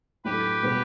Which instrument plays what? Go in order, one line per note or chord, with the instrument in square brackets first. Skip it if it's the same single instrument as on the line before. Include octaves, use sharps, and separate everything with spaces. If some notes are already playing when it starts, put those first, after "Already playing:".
[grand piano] A2 F#3 A3 D4 [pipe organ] G4 B4
[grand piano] B2 G3 B3 F#4